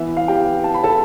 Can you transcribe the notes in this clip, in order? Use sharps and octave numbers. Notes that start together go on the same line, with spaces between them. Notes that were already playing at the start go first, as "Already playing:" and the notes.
Already playing: E3 B3 E5
F5
G4 G5
A5
B5
A4 A5